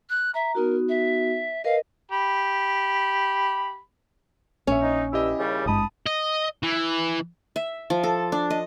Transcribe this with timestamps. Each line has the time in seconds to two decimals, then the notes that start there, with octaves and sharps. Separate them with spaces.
0.09 F#6
0.34 E5 A#5
0.55 B3 D#4 F#4 A#4
0.89 E5
1.64 A#4 B4 D#5 F5
2.11 G4 B5
4.67 A#1 C#4 C#5 E5
4.83 D#4
5.13 G2 E4 G4 D#5 E6
5.39 D#2 C#3 G3
5.66 G#1 G2 G#3 A5 B5 D#6
6.06 D#5
6.63 E3
7.56 E5
7.90 F3
8.04 A4
8.32 D4
8.50 D#5